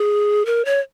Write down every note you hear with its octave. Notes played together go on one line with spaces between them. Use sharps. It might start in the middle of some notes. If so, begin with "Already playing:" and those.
Already playing: G#4
A#4
C#5